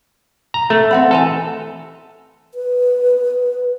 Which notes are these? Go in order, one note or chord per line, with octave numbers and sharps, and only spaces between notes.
A#5
A3 A4
C4 F#5 B5
E3 A4 G#5 A#5
B4